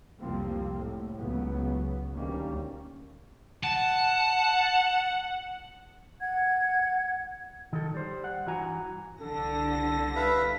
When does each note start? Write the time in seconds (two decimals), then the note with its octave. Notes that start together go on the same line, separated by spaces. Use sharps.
0.21 F1 C2 F3 G3 A#3 C4
0.79 A2
1.16 C#2 A2 C#3 F#3 B3
2.15 D2 D#3 G3 A#3 C#4
3.64 F#5 A5
6.19 F#5 G#6
7.73 D#3 A4
7.94 G3 C5
8.24 F#5
8.46 G2 E3 F#4 F#5 G#5 A#5
9.21 C2 D3 A4 A#6
10.16 B4 E5 F5